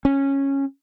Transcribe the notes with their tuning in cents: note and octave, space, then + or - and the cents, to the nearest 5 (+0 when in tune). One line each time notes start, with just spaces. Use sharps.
C#4 -10